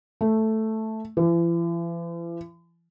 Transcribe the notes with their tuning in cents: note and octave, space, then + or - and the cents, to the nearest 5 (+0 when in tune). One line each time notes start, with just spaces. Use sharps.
A3 +0
E3 +45